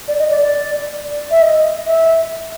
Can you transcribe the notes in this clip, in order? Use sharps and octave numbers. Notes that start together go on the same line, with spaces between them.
D5
D#5
D5
D5
E5
D#5
E5